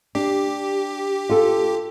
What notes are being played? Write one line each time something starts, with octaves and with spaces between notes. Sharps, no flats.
D4 G4
F4 A4